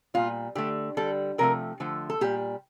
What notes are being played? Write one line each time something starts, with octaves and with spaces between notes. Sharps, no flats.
A#2 G3 F4
D3 A3 G4
D3 G3 A4
C3 F3 A3 A#4
D3 F3 A3
A4
A#2 G3 G4